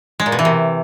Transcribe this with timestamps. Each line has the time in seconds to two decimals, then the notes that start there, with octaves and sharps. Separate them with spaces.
0.20 G#3
0.26 A#2
0.32 B2
0.39 E3
0.45 C3